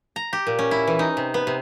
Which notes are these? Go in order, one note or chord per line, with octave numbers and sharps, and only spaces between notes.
A#5
G4
A#2
C#4
E4
E3
D#4
C3
B3
C3